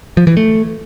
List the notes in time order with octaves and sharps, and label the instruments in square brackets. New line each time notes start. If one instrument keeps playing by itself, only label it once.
[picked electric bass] F3
E3
A3